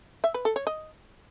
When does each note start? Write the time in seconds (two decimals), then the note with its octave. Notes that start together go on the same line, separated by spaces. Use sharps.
0.24 E5
0.34 B4
0.45 A4
0.56 C#5
0.67 D#5